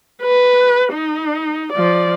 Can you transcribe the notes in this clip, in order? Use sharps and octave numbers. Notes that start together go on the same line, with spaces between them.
B4
D#4
F3 D5